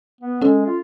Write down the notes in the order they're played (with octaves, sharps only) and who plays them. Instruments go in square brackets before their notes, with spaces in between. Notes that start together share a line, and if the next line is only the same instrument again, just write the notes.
[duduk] B3
[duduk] G#3 [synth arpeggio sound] C#4 A4
[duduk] F4